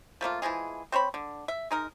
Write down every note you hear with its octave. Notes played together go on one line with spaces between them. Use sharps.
F3 A3 A#3 F4
E3 F3 G#3 G#4
C4 C5 C#5 B5
D3
E5
G#3 D#4 A#4